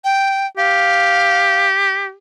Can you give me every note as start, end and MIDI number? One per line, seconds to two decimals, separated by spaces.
0.04 0.46 79
0.57 2.14 67
0.57 1.67 77